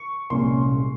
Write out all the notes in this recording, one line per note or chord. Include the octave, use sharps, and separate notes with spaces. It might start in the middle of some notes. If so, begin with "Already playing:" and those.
Already playing: C#6
C2 A#2 G#3 C#4 C6